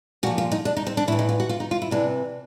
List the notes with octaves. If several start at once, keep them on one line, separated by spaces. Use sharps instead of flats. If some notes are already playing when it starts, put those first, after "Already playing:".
A#2 F3 F#4
F4
D#4
D4
D#4
C4
D4
A2 E3 E4
D#4
F4
F#4
F4
D#4
F4
E4
C3 E3 D4